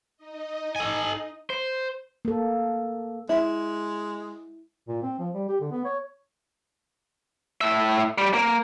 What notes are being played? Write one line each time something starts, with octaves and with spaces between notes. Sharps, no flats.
D#4 D#5
A4 G#5
C5
A#3 A4
G#3 E4
A#2
C4
F3
G3
G4
D3
B3
C#5
A2 E5
G3
A#3